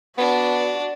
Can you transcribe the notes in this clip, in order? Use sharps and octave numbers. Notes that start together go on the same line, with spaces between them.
B3 D4 F#4